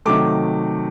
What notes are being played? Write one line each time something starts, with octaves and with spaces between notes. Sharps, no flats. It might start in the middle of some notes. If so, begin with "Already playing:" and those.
C3 D#3 F#3 A3 D6